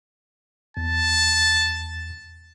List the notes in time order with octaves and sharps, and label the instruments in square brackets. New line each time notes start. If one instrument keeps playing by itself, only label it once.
[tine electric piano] E2 [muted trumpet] A5